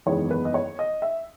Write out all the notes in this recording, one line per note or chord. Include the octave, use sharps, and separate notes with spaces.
F#1 E2 D#3 G#3 B3 C#5
B4
D#5
C#5
D#5
E5